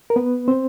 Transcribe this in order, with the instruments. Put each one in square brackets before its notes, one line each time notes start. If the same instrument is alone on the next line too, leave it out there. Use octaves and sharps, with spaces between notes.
[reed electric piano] A#4
B3 B4
C4 C5